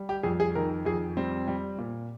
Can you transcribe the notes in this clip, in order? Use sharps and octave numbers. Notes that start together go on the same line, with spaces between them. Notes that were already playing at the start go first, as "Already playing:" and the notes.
Already playing: G3
G4
F2 G#4
G#4
D#3 A#4
F2 G#4
G3 C4
G3
A#2